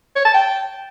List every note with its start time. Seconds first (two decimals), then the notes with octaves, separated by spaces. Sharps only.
0.16 C#5
0.25 A5
0.34 G5